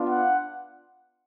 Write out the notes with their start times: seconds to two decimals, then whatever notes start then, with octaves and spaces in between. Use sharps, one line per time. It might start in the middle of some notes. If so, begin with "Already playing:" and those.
Already playing: B3 D4 F4
0.08 F#5